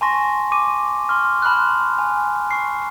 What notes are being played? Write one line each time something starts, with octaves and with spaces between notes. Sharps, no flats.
G#5 A5 C6 C#6 A#6
C#6 D6 D#7
C6 C#6 F6
A5 B5 C6 F6 F#6
G#5
C#6 C7